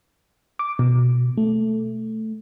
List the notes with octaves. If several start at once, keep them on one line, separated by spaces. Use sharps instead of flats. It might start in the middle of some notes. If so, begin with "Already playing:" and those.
D6
B2
A3